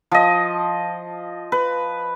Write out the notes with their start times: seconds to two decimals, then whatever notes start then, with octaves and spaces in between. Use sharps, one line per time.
0.11 F3 D#5
1.52 B4